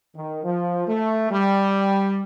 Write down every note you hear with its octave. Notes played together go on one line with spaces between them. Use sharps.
D#3
F3
A3
G3